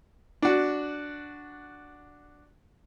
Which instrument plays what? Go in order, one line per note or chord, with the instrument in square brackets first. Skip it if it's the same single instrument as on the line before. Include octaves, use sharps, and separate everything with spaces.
[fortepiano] D4 F#4